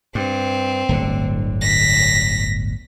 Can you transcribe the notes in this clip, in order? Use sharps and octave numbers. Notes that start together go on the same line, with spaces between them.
G2 C4
D1 G1 D3
A#6 B6